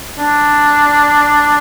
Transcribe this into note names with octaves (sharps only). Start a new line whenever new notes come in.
D4